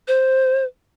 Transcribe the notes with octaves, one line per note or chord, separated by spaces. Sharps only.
C5